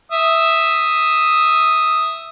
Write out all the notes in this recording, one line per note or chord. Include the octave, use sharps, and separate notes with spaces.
E5 D#6